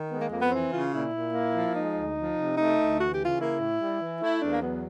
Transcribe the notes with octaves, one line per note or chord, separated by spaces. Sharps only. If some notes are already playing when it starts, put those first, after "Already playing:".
Already playing: D#3
G#3 B3
A#3
F2 A#3
B3
E3 C4
C#3 F4
A#2 E4
A#2
A#3
F3
G#3 D#4
D2
F3
C3
A3 D#4
D2
E3 F#4
G4
C#3
F4
A#3 E4
A2
G3
E3
A3 E4
E2 D4
A#3
F#3 B3